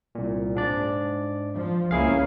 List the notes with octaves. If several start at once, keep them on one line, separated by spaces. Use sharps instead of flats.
C2 A#2
G#2 D4 D5
F3
C#2 A#3 C#4 E4 G#4 F5